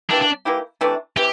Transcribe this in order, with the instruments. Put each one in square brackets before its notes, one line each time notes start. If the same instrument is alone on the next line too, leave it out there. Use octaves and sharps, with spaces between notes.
[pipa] E3 A#3 E4 G4 [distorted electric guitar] D4
[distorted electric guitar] D4
[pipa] E3 A#3 E4 G4
C3 E3 A3 D4
[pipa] C3 E3 [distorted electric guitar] G4